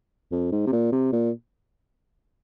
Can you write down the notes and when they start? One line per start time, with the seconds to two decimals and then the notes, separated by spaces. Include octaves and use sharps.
0.32 F2
0.52 G#2
0.67 C3
0.72 A#2
0.92 C3
1.13 A#2